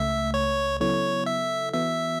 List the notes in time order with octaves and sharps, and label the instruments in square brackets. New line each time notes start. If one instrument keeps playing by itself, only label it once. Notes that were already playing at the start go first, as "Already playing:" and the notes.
Already playing: [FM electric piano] C#2 C#3 A3 [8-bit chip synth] E5
[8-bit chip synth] C#5
[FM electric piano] C#3 F#3 B3 E4 A4 [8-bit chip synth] C#5
[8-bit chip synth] E5
[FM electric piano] E3 B3 F#4 [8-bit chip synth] E5